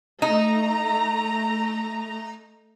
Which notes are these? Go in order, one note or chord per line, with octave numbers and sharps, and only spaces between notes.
A3 D#4 A#5